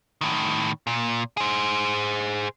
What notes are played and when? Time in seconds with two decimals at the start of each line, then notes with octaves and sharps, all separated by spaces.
0.21 A2 D#3
0.87 A#2
1.37 G#4 C5